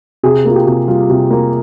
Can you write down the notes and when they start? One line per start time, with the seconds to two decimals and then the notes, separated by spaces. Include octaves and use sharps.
0.23 C3 G#4
0.45 A#3 F4
0.55 G4
0.67 C3
0.88 G3 F4
1.10 C3
1.31 A#3